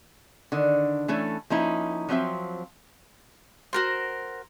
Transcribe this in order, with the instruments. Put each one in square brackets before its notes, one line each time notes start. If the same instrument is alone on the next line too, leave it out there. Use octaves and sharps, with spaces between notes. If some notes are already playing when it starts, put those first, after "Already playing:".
[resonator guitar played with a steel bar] D3 D#3
E3 A3 C#4 A4
F3 A#3 C#4 D#4 E4
F3 F#3 C4 F4 E5
[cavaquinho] F#4 A#4 C5